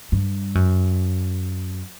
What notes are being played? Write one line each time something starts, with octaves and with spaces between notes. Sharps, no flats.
G2
F#2